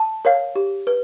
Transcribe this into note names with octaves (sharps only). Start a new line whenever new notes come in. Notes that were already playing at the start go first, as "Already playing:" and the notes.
Already playing: A5
A#4 C#5 F5
G4
B4